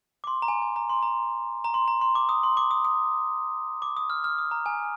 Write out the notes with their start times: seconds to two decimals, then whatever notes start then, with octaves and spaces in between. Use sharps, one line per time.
0.24 D6
0.27 C6
0.42 A#5
0.48 G#5
0.62 G#5
0.76 A#5
0.89 C6
1.03 A#5
1.64 A#5
1.74 C6
1.88 A#5
2.01 C6
2.15 D6
2.29 D#6
2.43 C6
2.57 D6
2.71 D#6
2.85 D#6
3.82 D6
3.97 D#6
4.10 F6
4.24 F6
4.38 D#6
4.51 A#5
4.66 G#5